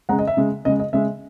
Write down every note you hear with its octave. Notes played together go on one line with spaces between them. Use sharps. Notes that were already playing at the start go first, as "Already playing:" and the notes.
C#3 G#3 F#5 A#5
D#5
E5
C#3 G#3
C#3 G#3 D#5
D#5
C#3 G#3 E5